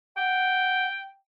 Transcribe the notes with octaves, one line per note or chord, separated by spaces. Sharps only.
F#5 G5